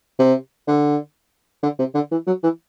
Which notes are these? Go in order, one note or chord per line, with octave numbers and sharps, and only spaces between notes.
C3
D3
D3
C3
D3
E3
F#3
E3